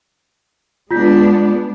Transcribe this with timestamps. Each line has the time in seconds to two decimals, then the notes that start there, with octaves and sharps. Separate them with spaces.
0.91 G#3 B3 D4 F4 G6 B6